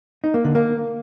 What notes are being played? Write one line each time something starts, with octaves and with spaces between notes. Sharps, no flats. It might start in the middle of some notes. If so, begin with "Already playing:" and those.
D#4
A#3
D3
A#3